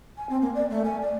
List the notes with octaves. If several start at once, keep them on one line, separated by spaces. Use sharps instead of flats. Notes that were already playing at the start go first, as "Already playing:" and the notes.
G#5
C4
A#3
D5
A3
G#5
D5